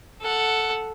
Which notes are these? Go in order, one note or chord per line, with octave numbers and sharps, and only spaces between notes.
A4 F#5